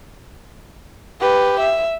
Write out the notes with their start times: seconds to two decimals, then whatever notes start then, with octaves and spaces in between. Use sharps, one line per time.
1.21 G4 B4
1.60 E5